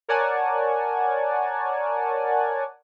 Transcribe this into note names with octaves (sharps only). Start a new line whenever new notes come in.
A#4 C#5 D5 F#5 G#5 A5